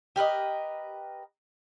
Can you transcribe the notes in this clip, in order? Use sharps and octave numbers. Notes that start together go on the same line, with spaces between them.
G4 A#4 B4 D#5